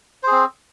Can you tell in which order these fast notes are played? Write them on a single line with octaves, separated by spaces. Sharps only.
C5 G#4 C4